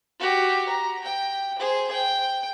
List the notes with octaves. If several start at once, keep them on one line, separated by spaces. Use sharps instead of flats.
F#4 G4
A#5
G5
G#4 C5
G5